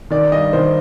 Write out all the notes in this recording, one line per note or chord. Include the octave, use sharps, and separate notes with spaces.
D#3 D5
G2 D#5
D#3 C5